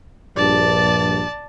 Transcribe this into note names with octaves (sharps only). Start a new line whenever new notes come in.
A#1 G2 D5 A5